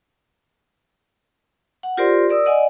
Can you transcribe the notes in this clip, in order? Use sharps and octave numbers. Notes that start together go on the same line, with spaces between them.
F#5
F4 G4 A#4 C5 D5 C6
A#4 D5 D#6 E6
D5 D#5 F#5 G#5